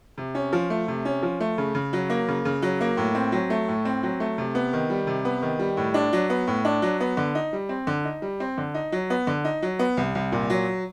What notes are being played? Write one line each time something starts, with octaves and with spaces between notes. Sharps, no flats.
C3
C#4
F3
A3
C3
C#4
F3
A3
C#3
C#3
F#3
A#3
C#3
C#3
F#3
A#3
A2
C4
F#3
A3
A2
C4
F#3
A3
C3
B3
D#3
G3
C3
B3
D#3
G3
A2
D4
F#3
B3
A2
D4
F#3
B3
D3
D#4
G3
C4
D3
D#4
G3
C4
D3
D#4
F#3
B3
D3
D#4
F#3
B3
C2
C2
A#2
F#3